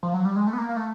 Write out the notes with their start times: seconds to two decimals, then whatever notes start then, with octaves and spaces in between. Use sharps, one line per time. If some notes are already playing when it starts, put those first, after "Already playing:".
0.03 F3
0.14 F#3
0.25 G3
0.36 G#3
0.47 A3
0.53 B3
0.58 A#3
0.69 A#3
0.76 A3